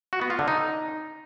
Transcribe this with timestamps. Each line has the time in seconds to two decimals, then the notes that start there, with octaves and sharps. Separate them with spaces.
0.13 F#4
0.21 B3
0.30 F4
0.39 D3
0.48 D#4